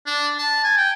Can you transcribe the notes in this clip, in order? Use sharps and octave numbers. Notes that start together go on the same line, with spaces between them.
D4
A5
G#5
G5